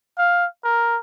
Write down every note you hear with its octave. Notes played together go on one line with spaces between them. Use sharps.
F5
A#4